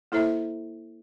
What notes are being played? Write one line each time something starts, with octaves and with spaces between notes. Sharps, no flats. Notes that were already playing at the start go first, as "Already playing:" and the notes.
A#3 E4 A4 C5 E5 A#5